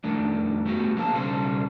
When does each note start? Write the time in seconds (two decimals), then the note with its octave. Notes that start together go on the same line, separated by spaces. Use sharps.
0.04 F2 D#3 A3 D4
0.66 A3 B3 F#4 G4
0.96 F3 A#3 C5 F5 A5
1.13 B1 C#3 G3 A4 C5